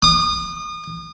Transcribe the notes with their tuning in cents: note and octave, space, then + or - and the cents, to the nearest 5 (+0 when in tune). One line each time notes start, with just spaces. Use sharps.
D#6 -35